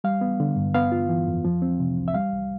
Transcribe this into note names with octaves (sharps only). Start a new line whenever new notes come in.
G3 F5
B3
D3
G2
B3 F5
F4
E3
F2
F3
C4
C3
C2
E5
G3 F5
C2